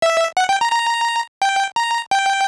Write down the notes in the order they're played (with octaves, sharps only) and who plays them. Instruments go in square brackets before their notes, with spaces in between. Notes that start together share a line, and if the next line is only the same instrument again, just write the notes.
[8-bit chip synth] E5
F#5
G5
A#5
A#5
G5
A#5
G5